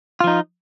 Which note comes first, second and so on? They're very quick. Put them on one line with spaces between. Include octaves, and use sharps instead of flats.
F4 F3 D#4